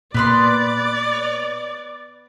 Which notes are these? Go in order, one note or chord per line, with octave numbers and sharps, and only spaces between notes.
A#2 B3 B4 D5 C6